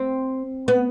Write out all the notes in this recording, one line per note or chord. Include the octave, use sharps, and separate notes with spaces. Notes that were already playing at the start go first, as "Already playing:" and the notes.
Already playing: C4
B3